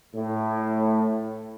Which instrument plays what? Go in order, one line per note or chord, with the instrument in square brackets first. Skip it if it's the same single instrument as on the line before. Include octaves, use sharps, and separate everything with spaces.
[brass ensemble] A2